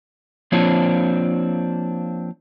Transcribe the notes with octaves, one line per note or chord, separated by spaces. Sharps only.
F3 A#3 C4 D4 F4 C#5